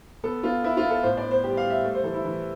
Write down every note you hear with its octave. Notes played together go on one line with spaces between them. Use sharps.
B3 A4
B3 F4
B3 E4
F4
B3
A4
A2 C5
D5
B3
C5
G3 G4
F5
G3
E5
A3
C5
E3 A4
E4
E3